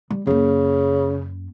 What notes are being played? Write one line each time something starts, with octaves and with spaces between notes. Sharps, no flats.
G3
F#2 C#3 A#3